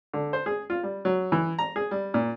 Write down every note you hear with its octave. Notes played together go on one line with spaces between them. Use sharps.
D3
C5
G#4
F4
G3
F#3
E3
A#5
G#4
G3
A#2